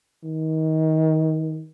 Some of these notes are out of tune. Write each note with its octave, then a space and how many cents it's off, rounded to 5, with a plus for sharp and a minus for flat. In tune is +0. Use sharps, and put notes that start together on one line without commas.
D#3 +25